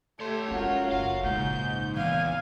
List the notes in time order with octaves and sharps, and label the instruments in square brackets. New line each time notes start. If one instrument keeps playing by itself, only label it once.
[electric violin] A3 G4 [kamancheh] A4 [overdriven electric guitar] C#5 C6
[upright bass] G#3 C#4 [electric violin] F4 A#4 [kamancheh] F#4 F#5
[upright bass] F#1 [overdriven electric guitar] F5
[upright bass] A#1 C#3 [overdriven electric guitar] G#2 [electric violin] G6
[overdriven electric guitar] E2 [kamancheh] F5 [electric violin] G#5